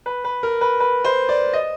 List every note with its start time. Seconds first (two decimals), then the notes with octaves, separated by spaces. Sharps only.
0.06 B4
0.24 B4
0.43 A#4
0.61 B4
0.80 B4
1.05 C5
1.29 D5
1.53 D#5